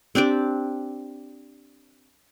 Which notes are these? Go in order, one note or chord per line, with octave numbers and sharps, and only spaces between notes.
C4 D4 G4 D5